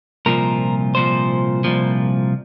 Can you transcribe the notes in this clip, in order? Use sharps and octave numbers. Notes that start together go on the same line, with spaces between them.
C2 A#2 F3 A#4
C2 A#2 F3 C5
C2 A#2 F3